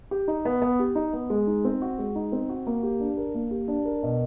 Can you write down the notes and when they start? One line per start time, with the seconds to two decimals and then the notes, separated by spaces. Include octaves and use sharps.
0.11 G4
0.28 D#4
0.45 B3
0.62 B3
0.79 G4
0.95 D#4
1.13 B3
1.30 G#3
1.47 D#4
1.65 C4
1.82 F#4
1.98 G#3
2.15 D#4
2.32 C4
2.49 F#4
2.67 A#3
2.83 G4
3.00 D4
3.17 A#4
3.35 A#3
3.51 G4
3.68 D4
3.85 A#4
4.03 B2